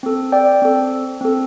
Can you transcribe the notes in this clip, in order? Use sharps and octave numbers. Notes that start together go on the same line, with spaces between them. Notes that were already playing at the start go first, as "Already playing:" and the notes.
C4 A4
D5 G5
C4 A4
C4 A4